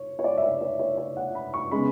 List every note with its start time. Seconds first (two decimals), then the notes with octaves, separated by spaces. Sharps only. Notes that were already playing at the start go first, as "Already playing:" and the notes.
Already playing: C#5
0.19 C#5
0.24 D5
0.37 E5
0.43 D5
0.61 C#5
0.79 C#5
0.98 C#5
1.17 F#5
1.35 B5
1.54 C#6
1.71 C#3 G#3 B3 B5